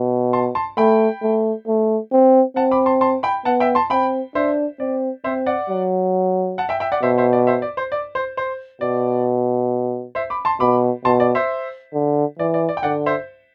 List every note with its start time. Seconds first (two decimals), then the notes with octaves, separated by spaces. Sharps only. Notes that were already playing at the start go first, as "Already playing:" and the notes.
Already playing: B2
0.33 A5 C6
0.55 A5 C6
0.77 A3 G5 B5
1.22 A3
1.68 A3
2.12 C4
2.56 C4 F#5 A5
2.72 B5 D6
2.86 A5 C6
3.01 A5 C6
3.23 G5 B5
3.45 B3 F#5 A5
3.60 E5 G5
3.75 A5 C6
3.90 C4 G5 B5
4.35 D4 C5 E5
4.80 C4 D5
5.24 C4 C5 E5
5.46 D5 F#5
5.69 F#3
6.58 F#5 A5
6.69 E5 G5
6.80 E5 G5
6.92 D5 F#5
7.02 B2 C5 E5
7.18 C5 E5
7.33 D5
7.47 C5 E5
7.62 D5
7.77 C5
7.92 D5
8.15 C5
8.37 C5
8.81 B2 D5
10.15 C5 E5
10.30 B5 D6
10.45 A5 C6
10.60 B2 B5 D6
11.05 B2 A5 C6
11.20 D5
11.35 C5 E5
11.94 D3
12.39 E3 D5
12.54 D5
12.69 D5
12.77 G5
12.83 D3 D5 F#5
13.06 C5 E5